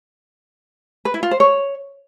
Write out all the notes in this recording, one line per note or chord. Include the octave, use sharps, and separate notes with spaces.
B4
E4
F4
C5
C#5